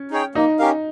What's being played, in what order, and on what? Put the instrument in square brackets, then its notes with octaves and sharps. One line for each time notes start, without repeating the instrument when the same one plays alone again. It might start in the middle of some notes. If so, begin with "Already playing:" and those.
Already playing: [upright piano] C#4
[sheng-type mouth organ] D#4 G#4 C#5 G5
[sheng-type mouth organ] A#3 [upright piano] D#4
[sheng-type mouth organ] C#4 G4 A#4 F5